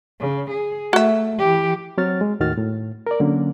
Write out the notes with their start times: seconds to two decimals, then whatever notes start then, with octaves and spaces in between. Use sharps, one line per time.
0.20 C#3
0.51 G#4
0.93 A3 F#4 E5
1.39 E3 G4
1.98 F#3 C4 F#4 C#5 F6 A6
2.21 G#3
2.40 D#2 A2 D#3 F#4 F6 A6
2.58 A2
3.07 A#4 D5
3.20 D3 F#3 A#3 C#4